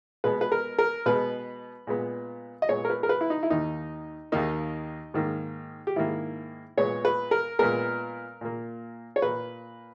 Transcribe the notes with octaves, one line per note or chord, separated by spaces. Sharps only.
B2 G#3 B3 B4
B4
A#4
A#4
B2 G#3 B3 B4
A#2 G#3 B3
D#5
A#2 G#3 B3 C#5
A#4
B4
A#4
B4
E4
D#4
E4
D#2 D#3 A#3 D#4
D#2 D#3 A#3 D#4
G#2 D#3 A#3
G4
G#2 D#3 A#3 E4
A#2 G#3 B3 C#5
B4
A#4
A#2 G#3 B3 A#4
A#2 A#3
C#5
A#2 A#3 B4